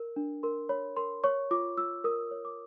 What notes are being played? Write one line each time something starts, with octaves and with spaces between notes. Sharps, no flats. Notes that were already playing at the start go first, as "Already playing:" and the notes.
Already playing: A#4
D4
A#4 C6
C#5 B5
A#4 C6
C#5 C#6
F4 D6
F4 E6
A#4 D#6
C#5
D6